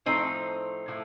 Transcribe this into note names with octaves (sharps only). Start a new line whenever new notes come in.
A2 F3 A3 C4 D#4
A2 F3 A3